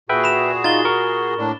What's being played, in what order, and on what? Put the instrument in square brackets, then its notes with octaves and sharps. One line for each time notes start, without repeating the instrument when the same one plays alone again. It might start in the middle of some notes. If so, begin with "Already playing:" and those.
[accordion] A#2 F#4 G#4 [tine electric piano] B4 E5 G5
[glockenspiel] B5 E7
[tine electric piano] D#4 F4 [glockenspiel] A6 G7
[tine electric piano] A#4 C#6
[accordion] A2 A#3 D4